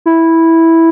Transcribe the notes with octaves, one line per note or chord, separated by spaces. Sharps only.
E4